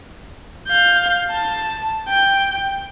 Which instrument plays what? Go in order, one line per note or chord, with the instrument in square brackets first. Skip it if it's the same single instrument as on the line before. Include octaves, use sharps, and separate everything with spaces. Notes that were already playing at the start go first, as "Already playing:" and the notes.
[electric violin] F5 G6
A5
G5